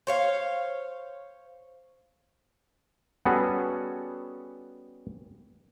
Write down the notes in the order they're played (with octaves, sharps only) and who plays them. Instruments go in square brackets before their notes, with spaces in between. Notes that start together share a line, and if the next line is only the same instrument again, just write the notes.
[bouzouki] C5 C#5 F5
[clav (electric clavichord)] G3 B3 C#4 F#4 G#4 A4